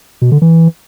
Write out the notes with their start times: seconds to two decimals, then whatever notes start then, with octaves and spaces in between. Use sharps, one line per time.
0.22 B2
0.32 D3
0.42 E3